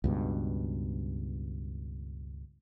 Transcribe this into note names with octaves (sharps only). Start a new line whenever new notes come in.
C#2 G2 B2